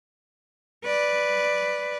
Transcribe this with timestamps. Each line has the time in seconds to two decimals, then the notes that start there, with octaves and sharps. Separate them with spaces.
0.84 B4 D5